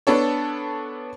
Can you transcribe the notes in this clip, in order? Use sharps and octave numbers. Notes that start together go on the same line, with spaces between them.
B3 D4 A4 C#5